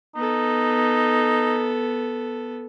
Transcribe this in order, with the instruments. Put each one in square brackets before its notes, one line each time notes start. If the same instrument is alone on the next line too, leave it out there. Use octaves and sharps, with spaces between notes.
[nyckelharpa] B3 A4 [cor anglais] D#4